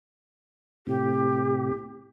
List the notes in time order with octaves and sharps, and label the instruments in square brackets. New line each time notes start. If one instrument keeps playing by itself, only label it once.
[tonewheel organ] A2 C3 [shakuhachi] G4